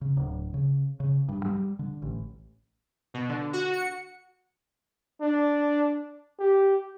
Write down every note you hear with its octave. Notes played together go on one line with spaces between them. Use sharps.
C#3
D1
C#3
C#3
G2
G3
D3
A1
B2
D3
F#4
C#7
D4
G4